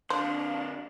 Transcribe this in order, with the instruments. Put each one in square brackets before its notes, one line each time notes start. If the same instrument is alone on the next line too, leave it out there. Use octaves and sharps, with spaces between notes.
[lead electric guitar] A#2 D3 [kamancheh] D4 [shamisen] C5 [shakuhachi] F5